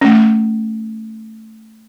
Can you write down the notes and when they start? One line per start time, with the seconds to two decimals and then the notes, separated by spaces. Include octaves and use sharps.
0.01 A3 C#4